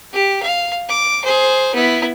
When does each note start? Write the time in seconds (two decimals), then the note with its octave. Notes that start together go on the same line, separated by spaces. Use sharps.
0.14 G4
0.43 F5
0.89 D6
1.24 G#4 C5
1.75 B3 E4